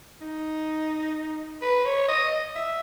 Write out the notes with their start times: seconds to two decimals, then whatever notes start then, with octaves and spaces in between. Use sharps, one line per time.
0.21 D#4
1.62 B4
1.85 C#5
2.08 D#5
2.55 E5